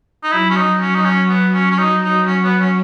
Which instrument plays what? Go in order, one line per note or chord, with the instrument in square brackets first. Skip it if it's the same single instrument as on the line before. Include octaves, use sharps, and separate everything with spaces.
[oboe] D#4
[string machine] F#3 [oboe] E4
[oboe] C#4
D#4
C#4
D#4
C#4
B3
C#4
C#4
D#4
D#4
C#4
B3
C#4